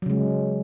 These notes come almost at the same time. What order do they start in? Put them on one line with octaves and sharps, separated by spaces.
F#3 C#3 G#3